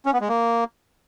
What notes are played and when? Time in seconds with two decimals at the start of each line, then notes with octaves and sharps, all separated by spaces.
0.06 C#4
0.13 B3
0.21 G#3
0.29 A#3